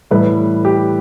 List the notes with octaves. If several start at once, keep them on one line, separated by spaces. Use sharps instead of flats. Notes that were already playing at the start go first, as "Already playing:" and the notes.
A2 E3 G3 B4
G4